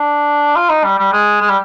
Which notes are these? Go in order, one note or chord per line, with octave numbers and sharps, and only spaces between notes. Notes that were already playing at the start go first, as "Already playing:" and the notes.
Already playing: D4
F4
D#4
G3
G3
G#3
G#3
G3